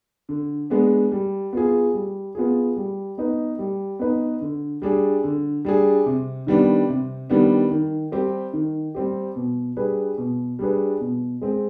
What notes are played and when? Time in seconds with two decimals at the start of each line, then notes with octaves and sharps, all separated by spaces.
0.29 D3
0.70 G#3 B3 D4
1.12 G3
1.53 B3 F4 G#4
1.94 G3
2.35 B3 F4 G#4
2.77 G3
3.18 B3 D#4 B4
3.59 G3
3.99 B3 D#4 B4
4.41 D3
4.82 G3 D4 G#4
5.24 D3
5.65 G3 D4 G#4
6.06 C3
6.47 D#3 G3 B3 D4
6.89 C3
7.30 D#3 G3 B3 D4
7.71 D#3
8.12 G3 C4 G4
8.53 D#3
8.95 G3 C4 G4
9.36 B2
9.77 G3 D4 G#4 B4
10.18 B2
10.59 G3 D4 G#4 B4
11.00 B2
11.41 G#3 C4